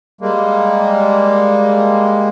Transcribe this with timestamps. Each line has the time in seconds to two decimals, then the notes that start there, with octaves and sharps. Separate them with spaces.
0.21 G3 G#3 A#3